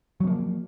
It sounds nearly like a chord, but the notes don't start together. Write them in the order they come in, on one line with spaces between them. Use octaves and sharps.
F#3 C4 A#3 F3